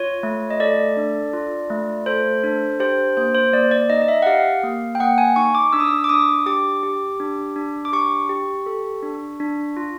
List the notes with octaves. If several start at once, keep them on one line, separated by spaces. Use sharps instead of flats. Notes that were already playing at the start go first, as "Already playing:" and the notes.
Already playing: F4 C#5
A3
D#5
A4 D5
D4
F4
A3
A4 C5
D4
G4 C5
A#3 C5
C5
A#3 D5
D5
D#4 D#5
D#5
E5
F#5
G4 F5
A#3
G5
A#3 F#5
G#5
D#4 C#6
D6
D4 E6
D#6
E6
D6
D4 D#6
G4 D6
G4
D4
D4
D6
G4 C#6
G4
A4
D4
D4
F4